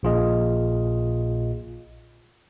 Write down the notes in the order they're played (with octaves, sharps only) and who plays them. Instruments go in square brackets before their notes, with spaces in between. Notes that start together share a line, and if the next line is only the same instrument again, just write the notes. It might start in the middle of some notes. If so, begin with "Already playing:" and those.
[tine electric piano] A#1 A#2 F4 G#4 D#5